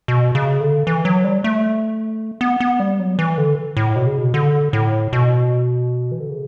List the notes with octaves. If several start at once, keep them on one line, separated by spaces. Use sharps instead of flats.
B2
C#3
D3
E3
F#3
G3
A3
B3
B3
G3
F#3
E3
D3
A2
B2
C#3
B2
D3
A2
B2
E3
D3
C#3